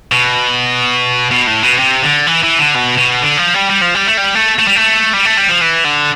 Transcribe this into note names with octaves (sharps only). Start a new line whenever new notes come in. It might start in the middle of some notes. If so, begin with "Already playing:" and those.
B2
B2
A2
B2
C3
D3
E3
E3
D3
B2
B2
D3
F3
G3
G3
F3
G3
A3
G3
A3
A3
G3
A3
G3
A3
G3
F3
E3
D3